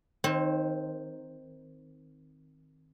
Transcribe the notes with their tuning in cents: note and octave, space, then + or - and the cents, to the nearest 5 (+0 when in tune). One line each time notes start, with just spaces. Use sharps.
D#3 +0 C4 +0 C#5 -45